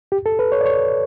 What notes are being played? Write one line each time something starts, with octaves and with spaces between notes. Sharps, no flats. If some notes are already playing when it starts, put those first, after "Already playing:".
G4
A4
B4
C#5
D5
C#5